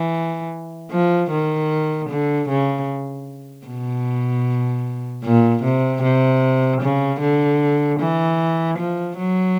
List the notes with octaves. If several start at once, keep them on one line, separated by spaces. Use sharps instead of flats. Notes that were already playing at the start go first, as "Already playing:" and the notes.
Already playing: E3
F3
D#3
D3
C#3
B2
A#2
C3
C3
C#3
D3
E3
F3
F#3